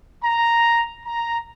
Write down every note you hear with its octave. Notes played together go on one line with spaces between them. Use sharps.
A#5
A#5